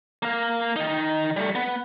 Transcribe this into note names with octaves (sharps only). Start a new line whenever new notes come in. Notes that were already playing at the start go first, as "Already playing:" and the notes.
A#3 F5
D#3 D#4
G3 A3
B3